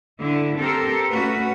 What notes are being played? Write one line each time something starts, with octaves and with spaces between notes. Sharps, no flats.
D3 E4
C4 G4 A4 A#4 C5
A3 C#4 F#4 B4